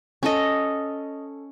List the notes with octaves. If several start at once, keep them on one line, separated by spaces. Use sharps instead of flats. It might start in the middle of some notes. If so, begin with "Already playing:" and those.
C#4 A4 D#5